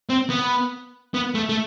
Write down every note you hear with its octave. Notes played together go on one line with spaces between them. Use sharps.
C4
B3
B3
A3
A3